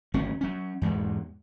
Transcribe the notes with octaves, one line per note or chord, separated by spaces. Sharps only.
G#1 D2 F#3 C#4
F#3 C#4
E2 G#2 B2 G#3